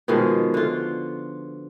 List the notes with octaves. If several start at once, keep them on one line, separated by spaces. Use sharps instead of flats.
B2 D#3 F3 G#3
D3 F4